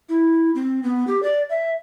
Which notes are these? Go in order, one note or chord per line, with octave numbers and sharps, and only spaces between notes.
E4
C4
B3
G4
D5
E5